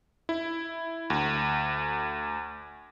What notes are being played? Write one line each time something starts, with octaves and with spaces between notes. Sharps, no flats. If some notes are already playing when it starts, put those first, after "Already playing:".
E4
D2